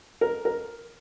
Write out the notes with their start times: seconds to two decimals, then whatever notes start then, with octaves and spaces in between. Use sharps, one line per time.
0.21 A#4
0.45 A#4